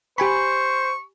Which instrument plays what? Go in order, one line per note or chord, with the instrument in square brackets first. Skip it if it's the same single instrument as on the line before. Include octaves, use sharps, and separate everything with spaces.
[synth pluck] G4 G#5 B5 [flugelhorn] C5 [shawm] C#6